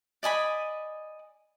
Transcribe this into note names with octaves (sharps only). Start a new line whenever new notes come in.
D5 D#5 G#5 B5